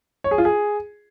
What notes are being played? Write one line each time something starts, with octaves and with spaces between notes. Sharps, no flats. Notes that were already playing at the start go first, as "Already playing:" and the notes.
C#5
G#4
F4
G#4